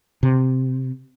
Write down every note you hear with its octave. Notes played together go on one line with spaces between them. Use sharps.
C3